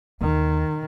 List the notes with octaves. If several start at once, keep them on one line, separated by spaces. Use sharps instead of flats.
D#2 D#3